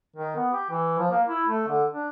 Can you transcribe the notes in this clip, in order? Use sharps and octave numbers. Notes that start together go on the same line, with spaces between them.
D#3
B3
G4
E3
F3
A#3
E4
A3
D3
D4